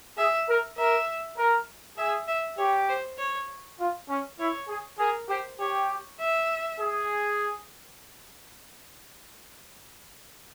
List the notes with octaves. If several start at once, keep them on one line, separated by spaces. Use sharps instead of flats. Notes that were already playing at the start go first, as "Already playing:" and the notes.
G#4 E5
A#4
A#4 E5
A#4
G#4 E5
E5
G4 C#5
C5
C#5
F4
C#4
E4 C#5
G#4
G#4 A#4
G4 C5
G4 C#5
E5
G#4